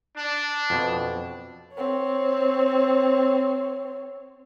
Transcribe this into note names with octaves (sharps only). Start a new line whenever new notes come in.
D4
F2 B2
C4 C#5